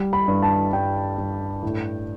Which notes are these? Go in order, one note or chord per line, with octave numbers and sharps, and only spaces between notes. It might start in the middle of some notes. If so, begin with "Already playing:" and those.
Already playing: G3
B5
G2
A5
G2 G5
G2
A2